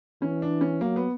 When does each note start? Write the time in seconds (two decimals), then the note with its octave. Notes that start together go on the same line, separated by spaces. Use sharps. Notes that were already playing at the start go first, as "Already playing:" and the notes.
0.21 E3 C#4
0.42 D4
0.61 C#4
0.81 F#3 A#3
0.96 B3